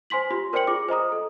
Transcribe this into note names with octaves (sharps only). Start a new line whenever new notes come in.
C5 G#5 C6 B6 F#7
F4 G4 C6
A#4 C5 D5 G5 C#7 F#7
F4 G#4 D6
C5 D#5 A#5 D#6
A4